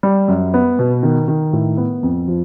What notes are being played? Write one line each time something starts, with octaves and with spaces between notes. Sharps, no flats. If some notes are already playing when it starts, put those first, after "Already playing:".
G3
F#2
B3
B2
D#3
D#3
A2
B3
F2
F3